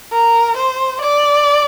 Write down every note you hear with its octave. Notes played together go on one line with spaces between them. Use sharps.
A#4
C5
D5